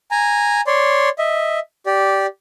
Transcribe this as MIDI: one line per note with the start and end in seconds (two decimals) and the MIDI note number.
0.11 0.61 80
0.11 0.61 82
0.67 1.09 73
0.67 1.09 74
0.67 1.09 84
1.18 1.59 75
1.18 1.59 76
1.86 2.26 67
1.86 2.26 74